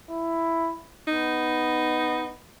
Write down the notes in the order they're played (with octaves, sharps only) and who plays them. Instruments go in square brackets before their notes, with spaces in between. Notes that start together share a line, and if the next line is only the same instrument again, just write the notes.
[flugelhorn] E4
[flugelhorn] B3 [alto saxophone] D#4